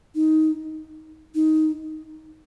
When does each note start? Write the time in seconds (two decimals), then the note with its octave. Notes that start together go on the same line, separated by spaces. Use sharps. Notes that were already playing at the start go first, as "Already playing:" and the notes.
0.15 D#4
1.35 D#4